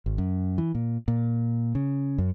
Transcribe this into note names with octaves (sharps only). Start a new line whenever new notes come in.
G#1
F#2
E3
A#2
A#2
C#3
F#2